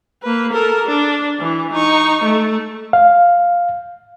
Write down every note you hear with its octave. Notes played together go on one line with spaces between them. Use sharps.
A#3 B4
A4 A#4
D4
E3
D#4 C#6
A3
F5